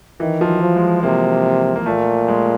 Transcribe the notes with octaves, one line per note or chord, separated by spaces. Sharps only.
D#3 E3
F3
F#3
F3
G#3
C3 A#3
A#3
A#2 A3
G#3